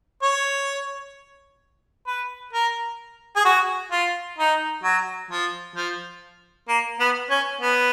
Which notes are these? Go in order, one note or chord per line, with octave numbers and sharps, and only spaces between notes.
C#5
B4
A#4
G#4
F#4
F4
D#4
F#3
F3
F3
A#3
B3
C#4
B3